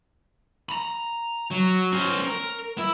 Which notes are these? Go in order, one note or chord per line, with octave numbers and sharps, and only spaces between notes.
A#5 B5
F#3
C#4 C5
A#4
E4